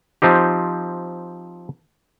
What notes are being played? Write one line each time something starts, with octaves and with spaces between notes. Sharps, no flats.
F3 C4 D#4 G4